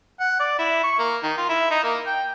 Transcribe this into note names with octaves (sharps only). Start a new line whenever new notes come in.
F#5
D5
E4
C#6
A#3
D#3
F4
E4
D#4
A#3
G5